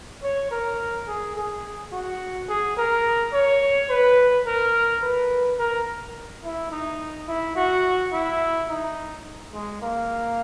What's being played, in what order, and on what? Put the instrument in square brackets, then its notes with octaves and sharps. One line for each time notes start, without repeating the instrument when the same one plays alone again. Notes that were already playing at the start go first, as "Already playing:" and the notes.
[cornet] C#5
A#4
G#4
G#4
F#4
G#4
A#4
C#5
B4
A#4
B4
A#4
E4
D#4
E4
F#4
E4
D#4
G#3
A#3